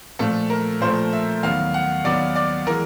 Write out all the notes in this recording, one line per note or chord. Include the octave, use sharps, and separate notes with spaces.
A#2 F3 A3 A4
A#4
A#2 F3 A3 C5
E5
D#2 D#3 F#3 B3 F5
F#5
D#2 D#3 F#3 B3 D5
D5
E3 G#3 A#4